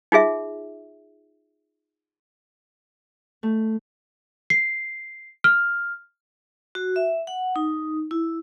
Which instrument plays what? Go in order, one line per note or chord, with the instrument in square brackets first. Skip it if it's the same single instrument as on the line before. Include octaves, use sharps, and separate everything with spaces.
[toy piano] D#4 F4 G#4 E5
[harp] A3
[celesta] C7
F6
[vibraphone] F#4
E5
F#5
D#4
E4